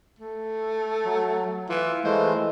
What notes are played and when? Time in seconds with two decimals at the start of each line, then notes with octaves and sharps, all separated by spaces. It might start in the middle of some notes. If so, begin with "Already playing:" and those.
0.19 A3
1.05 F#3
1.70 E3 F4
2.04 E3 G#3 A3 C5